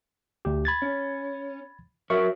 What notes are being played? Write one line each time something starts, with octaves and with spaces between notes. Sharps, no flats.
D2 G4
B5 G#6 A6
C#4
F#3 A#4 E5 C#6